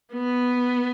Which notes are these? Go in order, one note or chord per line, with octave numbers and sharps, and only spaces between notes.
B3